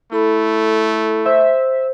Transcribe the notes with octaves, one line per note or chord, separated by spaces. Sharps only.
A3 E4 A4 B5
C5 E5